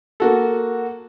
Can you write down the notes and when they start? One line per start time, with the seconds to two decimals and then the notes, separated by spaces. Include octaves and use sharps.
0.20 A#3 F#4 A4